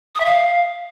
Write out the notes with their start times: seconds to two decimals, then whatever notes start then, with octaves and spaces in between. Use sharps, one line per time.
0.15 D#6
0.20 E5
0.25 F5